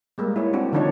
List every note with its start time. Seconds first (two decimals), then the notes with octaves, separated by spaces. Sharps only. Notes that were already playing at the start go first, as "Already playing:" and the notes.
0.18 G3 G#3 A#3
0.36 E4 C#5
0.53 C4 D4 F#4
0.72 D3 D#3 F3 D4 D#4 C#5